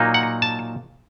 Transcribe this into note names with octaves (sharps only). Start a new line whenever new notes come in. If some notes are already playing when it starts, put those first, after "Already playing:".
Already playing: A#2 F#3 A#3 D#4
F#5
A5